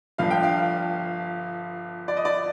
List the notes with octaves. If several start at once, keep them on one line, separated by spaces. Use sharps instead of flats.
G1 G2 F3 F5
G5
F5
D5
D#5
D5